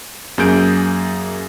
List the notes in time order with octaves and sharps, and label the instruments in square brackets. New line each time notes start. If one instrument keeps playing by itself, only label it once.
[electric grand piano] F#2 A#3 G#4 G6 D7